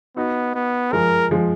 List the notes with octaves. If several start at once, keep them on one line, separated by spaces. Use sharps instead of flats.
B3 D#4 F#4
B3
F3 G#3 A#4
F3 G#3